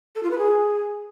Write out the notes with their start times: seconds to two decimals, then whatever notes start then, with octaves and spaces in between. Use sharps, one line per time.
0.15 A4
0.23 F4
0.31 B4
0.38 G#4